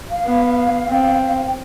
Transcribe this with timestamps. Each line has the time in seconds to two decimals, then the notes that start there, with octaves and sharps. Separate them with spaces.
0.10 F5
0.26 B3
0.88 C4
1.46 G5